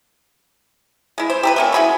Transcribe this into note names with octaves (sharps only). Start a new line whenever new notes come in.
G#3 E4
C5
G4 A4 B4
A3 A#3 C#4
E4 F#4 G#4 B5